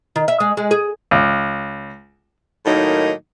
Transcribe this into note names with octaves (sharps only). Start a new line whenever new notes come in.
D#3
E5
G#3
G#3
G#4
C#2
A2 D#3 F#3 A#3 D#4